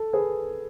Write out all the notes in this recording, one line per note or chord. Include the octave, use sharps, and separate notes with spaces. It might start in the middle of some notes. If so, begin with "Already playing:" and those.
Already playing: A4
G#4 B4